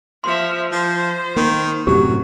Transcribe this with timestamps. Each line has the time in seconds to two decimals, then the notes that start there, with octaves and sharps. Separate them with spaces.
0.24 F3 E5 C6
0.72 F3 C5
1.36 D#3 A#3
1.87 F#2 A2 C3 F#3 G4